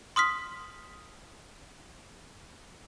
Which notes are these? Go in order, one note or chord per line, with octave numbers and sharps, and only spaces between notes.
C6 D#6 F6 B6